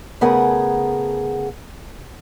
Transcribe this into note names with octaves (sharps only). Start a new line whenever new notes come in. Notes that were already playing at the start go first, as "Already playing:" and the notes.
C#3 A3 B3 G#4 A#4 F#5